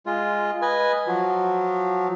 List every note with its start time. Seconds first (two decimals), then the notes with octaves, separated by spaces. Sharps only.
0.06 G#3 F4
0.62 B4 D#5 G#5
1.07 F3 F#3